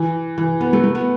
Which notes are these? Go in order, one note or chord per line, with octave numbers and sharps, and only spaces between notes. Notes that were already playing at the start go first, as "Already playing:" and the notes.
Already playing: E3
E3
B3
A3
A3
B3